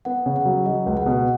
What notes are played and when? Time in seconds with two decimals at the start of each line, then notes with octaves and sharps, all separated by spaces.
0.05 B3 F#5
0.26 C#3
0.36 F#5
0.45 F#3
0.66 F#3 D#5
0.86 C#2
0.97 F#5
1.06 B2